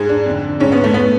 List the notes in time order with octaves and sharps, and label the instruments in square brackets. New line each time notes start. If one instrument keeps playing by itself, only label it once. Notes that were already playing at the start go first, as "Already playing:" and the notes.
Already playing: [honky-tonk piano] G#2 G#4
D4
F2 D3
G#2 C#4
B3
A3
B3